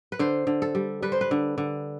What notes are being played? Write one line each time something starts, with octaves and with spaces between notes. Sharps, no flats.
B4
D3 C5
D3
A4
G3
G3 B4
C5
B4
D3
D3